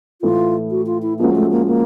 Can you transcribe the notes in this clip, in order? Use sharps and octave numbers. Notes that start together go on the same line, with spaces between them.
A2 E3 A3 F4
F#4
F4
E4
F3 G#3 A#3 C#4 F#4
A3
A#3
A#3